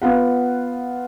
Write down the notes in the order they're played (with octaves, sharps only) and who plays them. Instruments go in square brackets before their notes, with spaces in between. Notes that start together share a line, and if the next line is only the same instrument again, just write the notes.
[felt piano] B3 F4 F#5